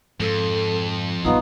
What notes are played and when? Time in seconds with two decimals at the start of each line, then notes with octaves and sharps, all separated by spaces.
0.20 F2 G#2 A4
1.25 A#1 G2 B3 D#4 F4 D#6